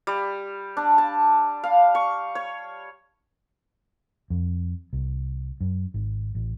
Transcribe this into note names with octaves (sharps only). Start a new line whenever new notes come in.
G3
D4
A5
F5
C#6
C#5
F2
C2
F#2
G#1
A1